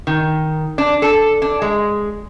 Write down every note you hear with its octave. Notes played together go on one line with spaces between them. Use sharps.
D#3
D4
A4
D4
G#3